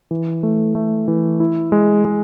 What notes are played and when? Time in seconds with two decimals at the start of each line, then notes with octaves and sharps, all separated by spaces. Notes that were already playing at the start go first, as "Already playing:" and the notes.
0.11 E3
0.43 A3
0.75 A3
1.08 E3
1.40 E4
1.72 G#3
2.05 G#3